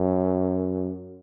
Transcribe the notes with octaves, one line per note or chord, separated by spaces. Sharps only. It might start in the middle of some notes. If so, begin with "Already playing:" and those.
Already playing: F#2